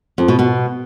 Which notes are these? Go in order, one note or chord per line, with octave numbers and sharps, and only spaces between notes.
F2
B2
B2